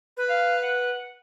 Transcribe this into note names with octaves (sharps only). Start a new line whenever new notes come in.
B4
F5
F#5